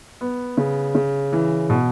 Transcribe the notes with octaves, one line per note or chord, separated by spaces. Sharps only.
B3
C#3
C#3
E3
B2